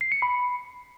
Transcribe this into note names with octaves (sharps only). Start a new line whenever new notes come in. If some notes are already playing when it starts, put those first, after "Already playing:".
C7
C#7
B5